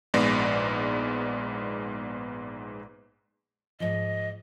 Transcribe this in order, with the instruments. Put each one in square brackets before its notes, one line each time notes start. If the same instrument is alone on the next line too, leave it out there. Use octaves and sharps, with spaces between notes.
[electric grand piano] A#1 G#2 G#3 B3 D5 A#6
[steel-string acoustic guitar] G#2 F3 [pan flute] D#5